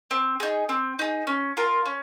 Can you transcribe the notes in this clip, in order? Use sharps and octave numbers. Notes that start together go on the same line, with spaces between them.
C4
D#4 G#4
C4
D#4 G#4
C#4
F4 A#4
C#4